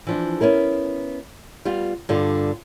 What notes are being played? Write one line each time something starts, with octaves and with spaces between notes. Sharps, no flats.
E3 F3 D4
B3 C#4 E4 A#4
G3 B3 F4
G2 D3 F4